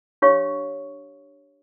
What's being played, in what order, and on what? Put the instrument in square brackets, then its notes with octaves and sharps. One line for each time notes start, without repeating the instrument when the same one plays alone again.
[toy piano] D4 G4 C#5 F5 C#6